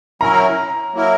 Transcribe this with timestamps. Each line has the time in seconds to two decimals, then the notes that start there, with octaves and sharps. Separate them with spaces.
0.21 F#3 C#4 E4 A#4 A#5
0.94 F#3 A#3 E4 A#4